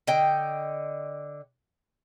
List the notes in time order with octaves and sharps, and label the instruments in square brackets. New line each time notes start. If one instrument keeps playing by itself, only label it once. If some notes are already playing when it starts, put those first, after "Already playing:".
[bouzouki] D3 D#5 G5